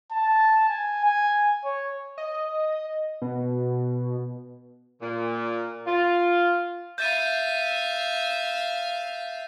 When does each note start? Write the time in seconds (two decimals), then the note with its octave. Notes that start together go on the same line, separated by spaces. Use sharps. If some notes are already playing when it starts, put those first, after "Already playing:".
0.12 A5
0.69 G#5
1.05 G#5
1.65 C#5
2.18 D#5
3.22 B2
5.02 A#2
5.87 F4
6.98 E5 F5 G6 A6 D#7